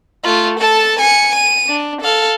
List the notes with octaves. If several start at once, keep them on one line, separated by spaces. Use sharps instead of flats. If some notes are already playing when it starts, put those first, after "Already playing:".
A3 F4
A4 A5
G#5 C#7
D#7
D4
A4 F5